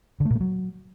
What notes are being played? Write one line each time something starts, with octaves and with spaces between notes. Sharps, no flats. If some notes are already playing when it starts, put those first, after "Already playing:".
D3
A3
A#2
A3
F#3